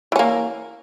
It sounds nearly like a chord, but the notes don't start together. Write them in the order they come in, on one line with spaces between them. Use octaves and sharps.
E3 C#4 A#3